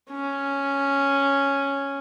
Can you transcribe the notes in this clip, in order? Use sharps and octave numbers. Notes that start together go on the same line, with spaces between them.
C#4